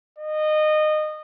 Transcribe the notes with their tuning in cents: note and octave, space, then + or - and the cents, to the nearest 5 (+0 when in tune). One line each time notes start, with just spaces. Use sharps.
D#5 -20